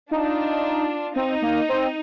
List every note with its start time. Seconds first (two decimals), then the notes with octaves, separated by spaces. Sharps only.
0.11 D4 D#4 F4
1.16 C4 D#4
1.42 A#3
1.69 C4